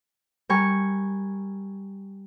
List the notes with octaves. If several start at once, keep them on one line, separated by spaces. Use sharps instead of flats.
G3 A#4 G#5 C#6